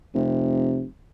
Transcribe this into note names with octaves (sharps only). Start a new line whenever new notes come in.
F1 C3